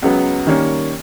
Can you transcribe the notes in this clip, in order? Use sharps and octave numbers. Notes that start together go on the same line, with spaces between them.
C#2 C#3 F#3 B3
D#3 G3 A#3 C#4